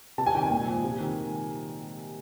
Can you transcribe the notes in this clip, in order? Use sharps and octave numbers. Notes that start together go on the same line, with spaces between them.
C3 A5
G#5
D#3 G5
G#5
A#2
F3
C3
D#3